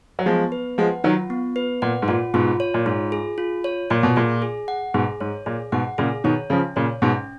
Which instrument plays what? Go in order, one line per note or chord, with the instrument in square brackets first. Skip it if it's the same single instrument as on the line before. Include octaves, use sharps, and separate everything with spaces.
[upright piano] F#3
[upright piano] F3 G#3 [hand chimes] B3
[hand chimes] B4
[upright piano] F3 G#3 [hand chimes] F#5
[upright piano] D#3 F#3 [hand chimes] F4
[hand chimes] B3
B4
[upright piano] A#2 [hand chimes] F#5
[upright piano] G#2
[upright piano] A#2 [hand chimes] F4
[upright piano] G#2 B2 [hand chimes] F4
[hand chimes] C#5
[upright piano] A#2
[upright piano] G#2 [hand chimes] F4
[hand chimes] G#4
F4
C#5
[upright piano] A#2 [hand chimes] F4
[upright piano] B2
[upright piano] A#2 [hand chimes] G#4
[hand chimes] G#4
F#5
[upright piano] G#2 B2 [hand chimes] G#4
[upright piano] G#2 [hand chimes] C#5
[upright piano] A#2 [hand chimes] G#4
[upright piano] G#2 B2 [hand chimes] F#5
[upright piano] A#2 C#3 [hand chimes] G#4
[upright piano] B2 D#3 [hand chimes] C#5
[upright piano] C#3 F3 [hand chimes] C#4
[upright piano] A#2 C#3 [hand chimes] C#5
[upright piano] G#2 B2 [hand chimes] C#4